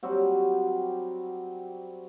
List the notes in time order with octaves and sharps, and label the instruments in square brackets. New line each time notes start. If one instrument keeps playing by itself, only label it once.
[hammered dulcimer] F#3 G3 C4 F#4